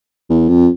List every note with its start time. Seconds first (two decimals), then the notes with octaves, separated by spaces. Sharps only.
0.30 E2
0.48 F2